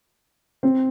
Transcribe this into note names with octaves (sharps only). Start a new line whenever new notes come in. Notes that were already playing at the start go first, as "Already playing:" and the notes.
C4